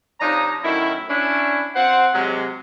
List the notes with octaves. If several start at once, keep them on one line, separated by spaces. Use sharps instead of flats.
C3 F3 D4 D#4 C#5 A#5
F#2 A2 D#3 E4
C#4 D4 E4
C4 F4 C5 F#5
C3 F#3 G#3